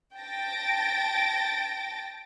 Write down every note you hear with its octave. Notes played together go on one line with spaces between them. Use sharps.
G5 A5 A6 A#6 D7